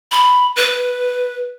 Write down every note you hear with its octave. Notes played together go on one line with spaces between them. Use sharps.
B5
B4